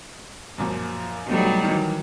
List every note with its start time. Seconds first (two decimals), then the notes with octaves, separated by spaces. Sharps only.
0.58 F#2 A#2 F3
1.27 B2 F#3 G3 A3 D#4
1.64 D#3 E3